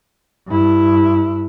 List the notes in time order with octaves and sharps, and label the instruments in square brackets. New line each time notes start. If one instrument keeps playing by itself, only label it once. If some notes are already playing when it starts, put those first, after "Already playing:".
[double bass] G2 E4